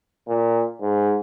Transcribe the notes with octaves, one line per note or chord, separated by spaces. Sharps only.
A#2
G#2